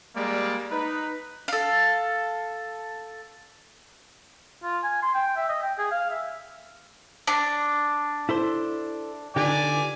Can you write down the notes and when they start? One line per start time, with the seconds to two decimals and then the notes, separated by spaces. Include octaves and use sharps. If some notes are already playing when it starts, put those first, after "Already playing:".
0.15 G3 G#3 A#3 D5
0.71 D#4 B4
1.48 A4 F5
4.63 F4
4.83 G#5
5.03 C6
5.14 G5
5.36 E5
5.49 D#5
5.62 G5
5.78 G#4
5.91 F5
6.10 E5
7.27 D4
8.29 E4 A4 C5
9.36 D3 D#4 G4 D5 G#5 D6